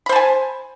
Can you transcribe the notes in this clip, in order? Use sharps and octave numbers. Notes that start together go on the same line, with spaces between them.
C5 G#5 A5 B5